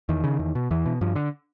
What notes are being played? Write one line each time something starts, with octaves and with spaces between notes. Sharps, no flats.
E2 D#3
C#3
E2
B2
E2 E3
B2
G2 F3
D3